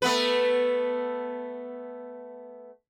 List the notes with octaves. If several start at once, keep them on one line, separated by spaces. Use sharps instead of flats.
A3 B3 B4